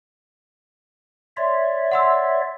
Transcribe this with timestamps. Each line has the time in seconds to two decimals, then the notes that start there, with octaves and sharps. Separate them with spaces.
1.37 C#5 D5 E5 C6
1.91 F#5 C6 E6